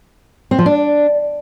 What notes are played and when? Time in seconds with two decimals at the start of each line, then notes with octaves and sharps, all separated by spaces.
0.51 C4
0.58 F3
0.66 D4